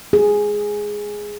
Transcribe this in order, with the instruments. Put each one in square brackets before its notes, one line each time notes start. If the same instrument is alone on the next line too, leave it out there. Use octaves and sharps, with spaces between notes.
[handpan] G#4